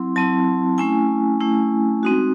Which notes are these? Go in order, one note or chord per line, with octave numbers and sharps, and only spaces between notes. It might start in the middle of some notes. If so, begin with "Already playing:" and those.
Already playing: F#3 C4 E4 C6
F#3 C4 E4 A5
A3 C#4 E4 G#5
A3 C#4 E4
G#3 C4 D#4 F#4